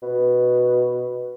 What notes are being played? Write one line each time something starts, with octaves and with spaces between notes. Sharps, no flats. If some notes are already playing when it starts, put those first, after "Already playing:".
B2